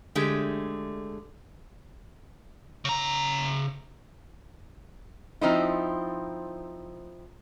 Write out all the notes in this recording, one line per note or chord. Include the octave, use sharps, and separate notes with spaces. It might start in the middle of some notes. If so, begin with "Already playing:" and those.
D3 G#3 A3 G4 G#4
C#3 A#5
F3 C4 D#4 E4